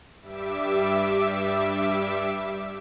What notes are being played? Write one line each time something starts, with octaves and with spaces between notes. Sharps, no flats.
G2 G3 E5 D6